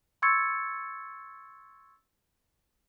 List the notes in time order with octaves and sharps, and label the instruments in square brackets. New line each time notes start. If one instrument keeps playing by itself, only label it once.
[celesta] C6 C#6 E6 G#6 A6 C#7